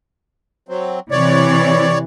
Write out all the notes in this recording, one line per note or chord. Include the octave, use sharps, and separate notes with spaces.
F#3 C4
C3 E3 C#5 D5